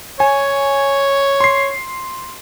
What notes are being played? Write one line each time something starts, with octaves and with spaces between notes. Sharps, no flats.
C#5 G#5
C6 C7